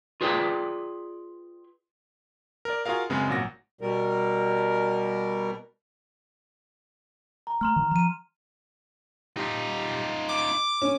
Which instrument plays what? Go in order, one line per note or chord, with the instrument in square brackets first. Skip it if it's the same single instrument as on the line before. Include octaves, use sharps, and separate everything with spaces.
[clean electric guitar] F4 G#4 B4 D5 G5
[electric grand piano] A#4 D5
F4 F#4 G#4 A#4 F5
F#2 C#3 G#3 B3 C4
G#1 A#2 F#3 F#5 A#6
[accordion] B2 G3 A#4
[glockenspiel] A#5
[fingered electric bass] A3 [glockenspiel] A#5 C6 F6
[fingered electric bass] D#3
[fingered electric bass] F3 [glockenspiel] A#5 D#7
[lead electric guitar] D#4 F4 [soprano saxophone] G4
[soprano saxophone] D6
[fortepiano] C#4